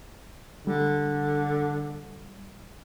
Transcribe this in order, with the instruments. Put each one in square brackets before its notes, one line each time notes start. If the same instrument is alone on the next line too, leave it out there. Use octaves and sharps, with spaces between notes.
[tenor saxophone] D3 [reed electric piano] G3